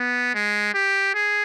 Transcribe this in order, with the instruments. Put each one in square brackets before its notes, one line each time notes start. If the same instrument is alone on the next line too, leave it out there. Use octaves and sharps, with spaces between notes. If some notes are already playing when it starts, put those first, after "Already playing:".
Already playing: [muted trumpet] B3
G#3
G4
G#4